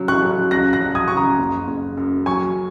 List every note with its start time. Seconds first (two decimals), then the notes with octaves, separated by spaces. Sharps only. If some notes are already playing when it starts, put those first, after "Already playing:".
Already playing: C#3 F#3
0.08 C#6 F#6
0.22 F#3
0.51 C#2 F#6 A#6
0.73 F#6 A#6
0.81 F#3
0.95 D#6 G#6
1.08 C#3 C#6
1.17 A#5 D#6
1.39 F#1
1.68 F#1
1.97 F#2
2.26 F#3 G#5 C#6